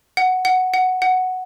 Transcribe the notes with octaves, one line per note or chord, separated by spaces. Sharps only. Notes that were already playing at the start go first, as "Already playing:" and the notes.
F#5
F#5
F#5
F#5